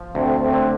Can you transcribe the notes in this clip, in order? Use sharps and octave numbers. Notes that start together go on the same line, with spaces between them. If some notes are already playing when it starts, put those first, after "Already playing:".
Already playing: F3
D2 A3 C4
A3 C4
D3